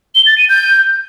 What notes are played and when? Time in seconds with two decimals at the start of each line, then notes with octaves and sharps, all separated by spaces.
0.15 G7
0.26 A6
0.38 D#7
0.49 G6